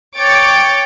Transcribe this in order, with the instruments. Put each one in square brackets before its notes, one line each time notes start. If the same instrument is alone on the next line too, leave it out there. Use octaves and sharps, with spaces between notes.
[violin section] C#5 G5 D6 A6 C#7